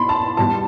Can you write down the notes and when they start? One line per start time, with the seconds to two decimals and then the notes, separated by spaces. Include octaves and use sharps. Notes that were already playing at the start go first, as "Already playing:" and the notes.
Already playing: B2 B5 C6
0.09 A5
0.37 E2 B2 G3 A5